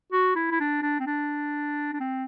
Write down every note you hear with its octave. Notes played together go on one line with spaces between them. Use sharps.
F#4
E4
E4
D4
D4
C4
D4
D4
C4